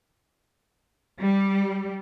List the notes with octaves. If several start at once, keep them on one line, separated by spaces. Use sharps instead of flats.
G3